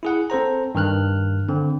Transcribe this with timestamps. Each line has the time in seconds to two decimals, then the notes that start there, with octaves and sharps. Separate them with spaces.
0.03 E4 G#4 F#5
0.30 C4 A4 C5 A#5
0.75 G2 D#3 F6 F#6
1.49 D3 C4